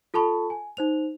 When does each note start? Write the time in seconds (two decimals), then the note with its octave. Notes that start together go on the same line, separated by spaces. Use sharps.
0.14 F4 A4 A5 B5 C#6
0.50 G#5
0.77 D#4 C5 F7